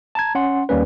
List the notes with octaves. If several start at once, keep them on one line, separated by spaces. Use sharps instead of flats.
A5 A#5 G#6
C#4 F#5 C6
D#2 G3 A#3 C#4 B4